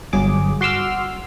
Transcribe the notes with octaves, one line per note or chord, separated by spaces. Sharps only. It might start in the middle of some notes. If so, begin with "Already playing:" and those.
G1 F#3 G#4 D6
F#4 C6 D6 E6 F6